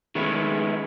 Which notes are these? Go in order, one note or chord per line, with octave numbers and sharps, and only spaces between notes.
D#3 G#3 A3 B3 C#4 E4